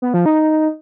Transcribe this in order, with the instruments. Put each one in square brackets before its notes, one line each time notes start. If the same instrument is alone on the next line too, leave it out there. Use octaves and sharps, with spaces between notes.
[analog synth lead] B3
F3
D#4